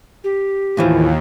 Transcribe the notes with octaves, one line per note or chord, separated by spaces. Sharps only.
G4
D#2 A2 E3 F3